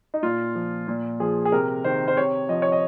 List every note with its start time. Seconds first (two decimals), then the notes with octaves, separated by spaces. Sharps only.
0.14 D#4
0.23 A#2 F4
0.55 F3
0.88 A#2
1.20 F3 G#4
1.45 G#4
1.52 C3 A#4
1.84 D#3 C5
2.08 C5
2.17 C3 C#5
2.49 F3 D#5
2.62 C#5
2.72 D#5